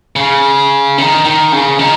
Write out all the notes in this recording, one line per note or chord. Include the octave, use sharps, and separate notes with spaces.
C#3
D#3
D#3
C#3
D#3